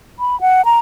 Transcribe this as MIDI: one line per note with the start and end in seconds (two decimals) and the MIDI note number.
0.19 0.39 83
0.41 0.65 78
0.65 0.79 82